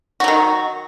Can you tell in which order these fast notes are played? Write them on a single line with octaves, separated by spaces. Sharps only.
F#4 F#3 D#3